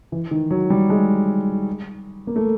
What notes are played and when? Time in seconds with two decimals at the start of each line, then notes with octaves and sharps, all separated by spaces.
0.12 E3
0.31 D#3
0.51 F#3
0.70 G3
0.90 G#3
2.27 A#3
2.36 A3